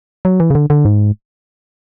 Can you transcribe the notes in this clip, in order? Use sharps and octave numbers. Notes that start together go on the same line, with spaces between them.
F#3
E3
C#3
D3
D3
G#2